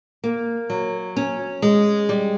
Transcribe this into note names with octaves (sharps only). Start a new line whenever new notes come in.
A#3
F#3
C#4
G#3
G3